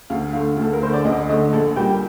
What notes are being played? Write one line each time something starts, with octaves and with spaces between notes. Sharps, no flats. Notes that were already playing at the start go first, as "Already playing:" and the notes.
D2 F5
D3 A3 F5
D2
A4
A#4
D3 A3 C5
D5
D2 D#5
D3 A3 D#5
A#1 A4
A#2 G3 A#3 G5